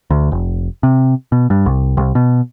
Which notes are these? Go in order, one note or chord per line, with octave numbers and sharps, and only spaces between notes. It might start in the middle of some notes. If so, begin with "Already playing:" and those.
D2
F1
C3
B2
G2
C2
C2
B2